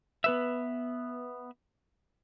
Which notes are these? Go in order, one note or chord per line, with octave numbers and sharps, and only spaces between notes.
B3 B4 E5